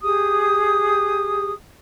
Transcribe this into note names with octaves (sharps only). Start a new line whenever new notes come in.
G4 G#4 D#6